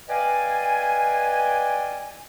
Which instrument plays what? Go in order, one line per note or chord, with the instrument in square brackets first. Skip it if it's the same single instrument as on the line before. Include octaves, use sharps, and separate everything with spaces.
[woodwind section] B4 D5 D#5 F5 G5 G#5